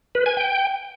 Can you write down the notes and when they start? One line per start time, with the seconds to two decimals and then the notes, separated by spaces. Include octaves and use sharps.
0.15 B4
0.26 G#5
0.37 G5